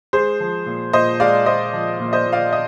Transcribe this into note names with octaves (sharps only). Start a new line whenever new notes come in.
G#3 G#4 C5
F3
A#2
A#2 C5 D#5
G#3 D5 F5
G#3 C5 D#5
F3
A#2
C5 D#5
A#2
D5 F5
D#5